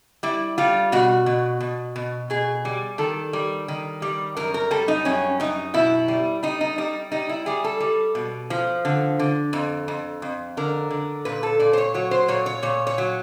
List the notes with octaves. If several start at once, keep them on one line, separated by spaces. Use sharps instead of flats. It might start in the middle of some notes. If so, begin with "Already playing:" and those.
G3 E4
G3 F4
B2 F#4
B2
B2
B2
B2 G#4
G3
D#3 A4
G3
D#3
G3
F#2 A#4
A#4
G3 A4
D#4
F#2 C#4
F#2 D#4
B2 E4
G3
G3 D#4
D#4
G3 D#4
G3 D#4
E4
G3 G#4
A4
G3
B2
F3
D3
D3
F2
F2
F2
D3 A#4
D3
A#2 B4
A4
A#2 D5
C5
C#5
F#3 C#5
C5
A#2 C#5
C#5
A#2 C#5
C#5
F#3